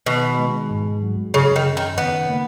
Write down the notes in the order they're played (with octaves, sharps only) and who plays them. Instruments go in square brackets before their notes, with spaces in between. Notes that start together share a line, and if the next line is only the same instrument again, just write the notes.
[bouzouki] B2 [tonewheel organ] D#3
[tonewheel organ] G#3
G#2
F#3
[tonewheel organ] F#2 [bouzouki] C#3
[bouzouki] D#3
[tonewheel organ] C#3
[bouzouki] D#3
[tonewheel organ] D#3 [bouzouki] B3
[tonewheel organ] A#3